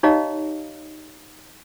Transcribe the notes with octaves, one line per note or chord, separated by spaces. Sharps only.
D#4 G4 C#5 D#5 F5 A#5